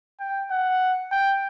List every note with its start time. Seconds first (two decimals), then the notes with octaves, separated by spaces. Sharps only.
0.20 G5
0.51 F#5
1.12 G5